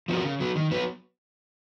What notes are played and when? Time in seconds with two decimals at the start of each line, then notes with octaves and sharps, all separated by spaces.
0.08 F3 B3 F#4 A#4
0.24 C#3
0.40 F#3 B3
0.56 D#3
0.71 F#3 B3 F#4 B4